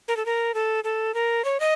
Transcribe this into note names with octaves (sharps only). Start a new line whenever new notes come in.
A#4
A4
A#4
A4
A4
A#4
C#5
D#5